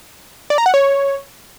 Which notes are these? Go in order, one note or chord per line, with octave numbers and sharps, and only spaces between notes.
D5
A#5
F#5
C#5